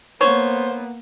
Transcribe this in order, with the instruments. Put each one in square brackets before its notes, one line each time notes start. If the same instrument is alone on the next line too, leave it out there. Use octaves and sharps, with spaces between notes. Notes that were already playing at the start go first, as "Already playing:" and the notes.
[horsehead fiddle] A#3 B3 [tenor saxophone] C5 [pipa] C#5